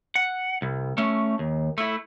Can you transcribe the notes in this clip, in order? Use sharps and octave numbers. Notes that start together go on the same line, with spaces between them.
F#5
C2
A3 C#4
D#2
A3 E4